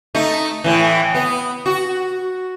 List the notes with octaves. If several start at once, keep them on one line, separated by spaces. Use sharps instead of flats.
A3 D#4
A2 E3
B3
F#4